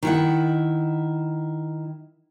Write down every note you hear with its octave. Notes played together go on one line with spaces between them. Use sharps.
D#3 E4 F#5